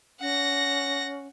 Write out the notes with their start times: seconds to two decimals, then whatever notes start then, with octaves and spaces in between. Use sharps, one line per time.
0.21 C#4 F#5 A#6